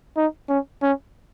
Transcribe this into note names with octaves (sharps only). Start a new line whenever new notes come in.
D#4
C#4
C#4